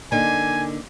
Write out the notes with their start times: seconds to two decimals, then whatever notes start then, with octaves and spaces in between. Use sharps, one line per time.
0.12 D3 A#3 D#4 G#5